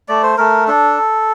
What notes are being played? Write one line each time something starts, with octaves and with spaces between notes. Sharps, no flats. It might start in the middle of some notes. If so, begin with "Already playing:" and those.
A3 D5
C5
A3 A#4
D4 A4